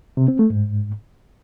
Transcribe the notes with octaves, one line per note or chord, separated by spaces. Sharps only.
C3
C4
A3
G#2